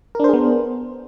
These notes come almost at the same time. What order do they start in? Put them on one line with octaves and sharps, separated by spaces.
A#4 D4 C5 G#4 B3